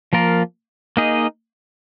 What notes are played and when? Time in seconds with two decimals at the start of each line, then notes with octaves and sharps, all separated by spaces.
0.13 F3 A#3 F4 A#4
0.97 A#3 D#4 G#4 D#5